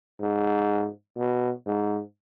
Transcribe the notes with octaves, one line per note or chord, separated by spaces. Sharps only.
G#2
B2
G#2